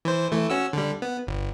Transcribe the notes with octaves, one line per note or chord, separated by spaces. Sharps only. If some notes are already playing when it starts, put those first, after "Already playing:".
E3 C5
E3 A3
C#4 F#4 E6
D3 G3
B3
G1